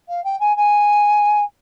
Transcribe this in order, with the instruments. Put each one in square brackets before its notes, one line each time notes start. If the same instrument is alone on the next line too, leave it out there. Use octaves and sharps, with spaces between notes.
[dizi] F5
G5
G#5
G#5